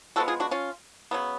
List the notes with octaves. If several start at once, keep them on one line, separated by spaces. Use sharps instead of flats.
F3 G#3 B3 F#4 A4
F4 G#4
D4 F#4
C#4 F4
C#3 F#3 B3